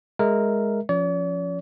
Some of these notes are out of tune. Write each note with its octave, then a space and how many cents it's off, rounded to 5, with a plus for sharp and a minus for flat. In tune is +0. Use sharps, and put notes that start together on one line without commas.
G#3 +0 A#4 +0 E5 +0
F3 +5 C#4 +0 D5 -45